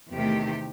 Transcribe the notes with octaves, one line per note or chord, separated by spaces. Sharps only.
E2 C3 D#3 A3 G4